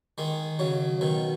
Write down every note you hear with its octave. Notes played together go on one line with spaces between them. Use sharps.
D#3 G#3
C#3 F#3
B2 D#3